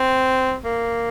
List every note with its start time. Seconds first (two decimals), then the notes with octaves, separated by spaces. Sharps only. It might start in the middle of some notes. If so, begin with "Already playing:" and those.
Already playing: C4
0.64 A#3